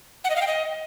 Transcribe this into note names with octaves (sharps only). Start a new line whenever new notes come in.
F#5
D#5
F5
G5
D#5